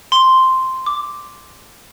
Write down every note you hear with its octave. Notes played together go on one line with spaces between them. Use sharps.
C6
D6